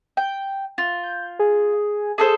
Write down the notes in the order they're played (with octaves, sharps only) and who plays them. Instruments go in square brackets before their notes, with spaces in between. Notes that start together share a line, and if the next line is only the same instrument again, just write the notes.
[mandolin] G5
F4
[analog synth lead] G6
G#4
[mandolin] G#4 A4 C5